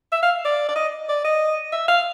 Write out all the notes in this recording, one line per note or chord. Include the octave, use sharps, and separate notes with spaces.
E5
F5
D5
D5
D#5
D5
D#5
E5
F5